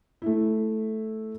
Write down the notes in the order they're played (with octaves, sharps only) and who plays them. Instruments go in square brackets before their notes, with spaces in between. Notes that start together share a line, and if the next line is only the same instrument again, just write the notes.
[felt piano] A3 E4